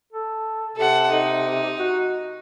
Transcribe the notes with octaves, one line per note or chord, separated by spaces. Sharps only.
A4
C3 A4 F#5
D#4
F#4